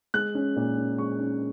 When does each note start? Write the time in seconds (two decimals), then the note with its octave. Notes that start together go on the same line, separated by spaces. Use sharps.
0.14 G#3 F#6
0.35 C#4
0.56 A#2
0.77 C#4
0.98 G#3 C#6
1.20 C#4